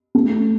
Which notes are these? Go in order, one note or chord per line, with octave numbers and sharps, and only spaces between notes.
A3